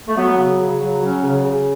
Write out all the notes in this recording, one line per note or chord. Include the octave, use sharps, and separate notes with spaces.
A3
F#3 B3
C#3
C#3
F#3
F#3 C#4
C#3
C#3